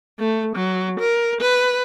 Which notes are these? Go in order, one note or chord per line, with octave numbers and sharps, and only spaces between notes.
A3
F#3
A#4
B4